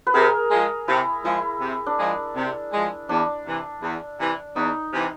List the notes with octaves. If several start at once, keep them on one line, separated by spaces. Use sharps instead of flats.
B4
C3 G#4 A#4
F3 G#3
C3 E4
F3 G#3 E4
C3
D4
F3 G#3
C3
F3 G#3
E2 D4
C3 E3
E2
C3 E3
E2 D#4
C3 E3